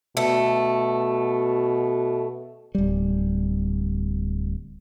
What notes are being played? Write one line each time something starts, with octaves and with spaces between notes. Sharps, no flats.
B2 A3
D1 G3